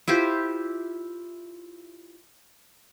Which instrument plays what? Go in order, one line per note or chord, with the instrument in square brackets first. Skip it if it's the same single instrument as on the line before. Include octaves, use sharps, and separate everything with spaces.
[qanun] E4 F4 G4 C5